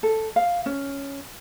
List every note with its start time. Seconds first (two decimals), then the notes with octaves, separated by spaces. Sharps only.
0.03 A4
0.36 F5
0.66 C#4